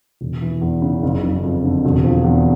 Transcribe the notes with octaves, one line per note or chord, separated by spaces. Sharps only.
E1
E3
E2
C#3
F#1
F#1
F2
D3
E1
F3
E2